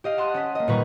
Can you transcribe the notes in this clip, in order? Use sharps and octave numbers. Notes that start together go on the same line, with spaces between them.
G4 D#5 F5
F#5 A5 C6 D#6 F#6
C#4 D#5 B6
A#3 D#5
A#2 D#3 G3 B4 A#5 C#6